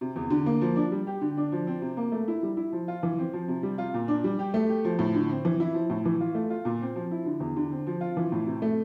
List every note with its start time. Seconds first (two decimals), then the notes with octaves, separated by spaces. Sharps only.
0.01 C3
0.16 E2
0.30 D3
0.46 A#3
0.61 F3
0.76 D4
0.92 G3
1.07 G4
1.21 D3
1.37 D4
1.52 F3
1.67 C4
1.82 C3
1.97 A#3
2.12 A3
2.28 E4
2.43 G3
2.57 E4
2.72 F3
2.88 F4
3.03 E3
3.18 C4
3.33 F3
3.48 C3
3.63 G3
3.78 F4
3.94 A#2
4.08 D4
4.24 G3
4.39 G4
4.54 A3
4.69 G4
4.85 F3
4.99 A2
5.14 D3
5.30 C4
5.45 E3
5.60 E4
5.74 F3
5.90 A2
6.05 E3
6.21 F4
6.35 A3
6.50 F4
6.65 A#2
6.81 C4
6.96 F3
7.11 E4
7.25 D3
7.40 E2
7.56 D3
7.71 C4
7.87 F3
8.01 F4
8.17 E3
8.32 A2
8.46 C3
8.62 A3